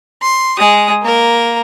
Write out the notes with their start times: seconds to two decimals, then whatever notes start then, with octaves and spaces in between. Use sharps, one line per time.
0.22 C6
0.58 G#3 D#6
1.03 A#3 A#4